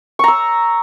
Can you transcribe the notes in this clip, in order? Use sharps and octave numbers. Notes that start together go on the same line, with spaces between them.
A#5 C#6 E6